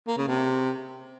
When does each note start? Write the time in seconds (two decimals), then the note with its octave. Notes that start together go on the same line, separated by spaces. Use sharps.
0.07 A#3
0.17 C#3
0.28 C3